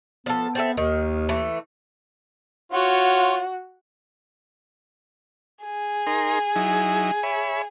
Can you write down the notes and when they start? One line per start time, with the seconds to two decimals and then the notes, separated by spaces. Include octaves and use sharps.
0.26 F3 B3 A4
0.55 C4 A4 E5
0.77 D#2 D#3
1.29 E3 A3
2.72 F4 F#4 C#5 F#5
5.64 G#4
6.07 D#4 A#4 C6
6.56 F#3 D#4 E4
7.23 C#5 E5 B5